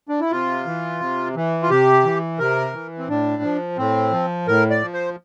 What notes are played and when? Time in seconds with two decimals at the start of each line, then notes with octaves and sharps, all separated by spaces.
0.09 D4
0.20 E4
0.31 C3 F4
0.66 E3
1.00 C3
1.36 E3
1.63 F4
1.70 C3 G4
2.05 E3
2.39 C3 A#4
2.74 E3
2.98 C4
3.09 A2 D4
3.43 F3
3.78 A2 C4
4.12 F3
4.47 A2 A#4
4.70 D5
4.81 F3
4.93 C5